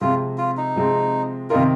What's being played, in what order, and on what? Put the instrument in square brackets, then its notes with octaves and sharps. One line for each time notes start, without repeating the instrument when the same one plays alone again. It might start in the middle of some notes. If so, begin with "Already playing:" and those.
[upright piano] C3 F3 G#3 C4 [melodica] F4
[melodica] F4
D#4
[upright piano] C3 F3 G#3 C4
[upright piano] C3 D#3 C4 D#4 A#4 [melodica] F4